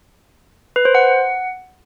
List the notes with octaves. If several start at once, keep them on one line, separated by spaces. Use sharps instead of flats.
B4
C5
F#5